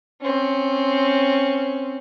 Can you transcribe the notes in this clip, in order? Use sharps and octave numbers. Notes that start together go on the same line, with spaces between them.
C4 C#4